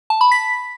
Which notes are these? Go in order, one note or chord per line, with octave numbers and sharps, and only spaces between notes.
A5
B5
B6